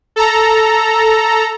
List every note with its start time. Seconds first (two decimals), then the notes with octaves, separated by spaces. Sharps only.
0.16 A4 A#5